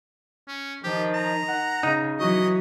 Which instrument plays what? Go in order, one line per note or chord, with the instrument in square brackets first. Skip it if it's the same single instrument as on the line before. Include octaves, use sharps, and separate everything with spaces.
[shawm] C#4
[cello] D#3 [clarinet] F3 [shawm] G4
[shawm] A#5
[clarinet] F#5
[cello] C#3 [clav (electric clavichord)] D#4
[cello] E3 F#3 [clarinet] F#4 [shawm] D#5